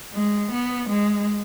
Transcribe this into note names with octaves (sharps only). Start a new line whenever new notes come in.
G#3
B3
G#3